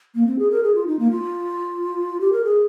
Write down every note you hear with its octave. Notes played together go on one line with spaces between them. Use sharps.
A#3
C4
G#4
A#4
G#4
F4
D#4
A#3
F4
G4
A#4
G#4